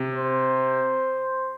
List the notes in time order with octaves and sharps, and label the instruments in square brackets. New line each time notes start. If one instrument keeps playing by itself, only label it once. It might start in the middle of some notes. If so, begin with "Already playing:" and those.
Already playing: [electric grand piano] C3
[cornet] C5